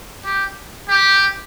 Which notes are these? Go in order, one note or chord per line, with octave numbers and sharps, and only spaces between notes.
G4
G4